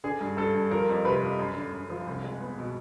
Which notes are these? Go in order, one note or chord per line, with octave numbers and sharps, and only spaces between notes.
D3 G#4
G2
G2 A4
G2
F3 A#4
F2
C3 B4
F2
F#2
D3
F#2
F3
C2
G#3
B3
B2